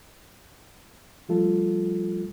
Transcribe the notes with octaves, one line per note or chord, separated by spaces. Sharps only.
F3 G3 A3 F4 A4